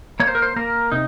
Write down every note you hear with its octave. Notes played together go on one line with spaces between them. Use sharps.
A#3 C#5
C5
A#4
C5
A#3 A#4
C3 D#4